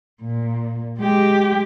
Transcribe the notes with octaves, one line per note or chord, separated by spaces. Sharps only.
A#2
G#3 G4